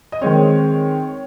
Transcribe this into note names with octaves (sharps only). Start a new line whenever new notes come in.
D#5
D#3 G#3 C4 C#5